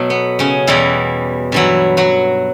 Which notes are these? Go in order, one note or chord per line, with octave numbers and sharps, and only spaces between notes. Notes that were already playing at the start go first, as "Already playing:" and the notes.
Already playing: B2 F#3 A3
B3
C#3 C#4
E2 B2 E3 G3 E4
G2 E3 F#3 E4
F#3 F#4